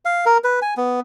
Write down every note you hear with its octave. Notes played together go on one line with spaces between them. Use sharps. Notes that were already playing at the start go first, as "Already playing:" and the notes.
F5
A#4
B4
G#5
B3